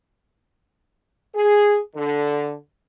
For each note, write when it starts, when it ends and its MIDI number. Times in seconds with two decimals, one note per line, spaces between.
1.35 1.79 68
1.95 2.54 50